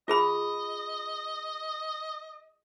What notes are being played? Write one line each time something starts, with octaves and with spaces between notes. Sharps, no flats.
F4 G#4 D#5 B5